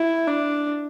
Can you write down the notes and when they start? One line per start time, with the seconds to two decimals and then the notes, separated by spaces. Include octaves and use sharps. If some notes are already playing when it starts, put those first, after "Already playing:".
Already playing: E4
0.27 D4